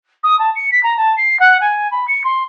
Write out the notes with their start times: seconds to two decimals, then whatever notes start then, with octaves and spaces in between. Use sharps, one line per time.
0.23 D#6
0.39 A5
0.55 C#7
0.71 B6
0.83 A#5
0.97 A5
1.17 C7
1.39 F#5
1.61 G#5
1.91 B5
2.08 C#7
2.24 C6